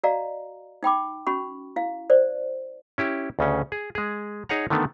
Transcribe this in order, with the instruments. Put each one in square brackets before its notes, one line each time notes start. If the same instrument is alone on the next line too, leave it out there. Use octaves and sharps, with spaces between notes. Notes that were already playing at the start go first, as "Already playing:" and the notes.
[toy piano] F#4 D5 D#5 F5 A#5
D#4 G5 B5 D6
C#4 F#4 B5 C#6
E4 F5
C5 D5
[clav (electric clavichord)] C#4 E4 G4
D2 C#3 C#4
G#4
G#3 G#4
D#4 G#4 C#5 F#5 A#5
D3 D#3 A3 B3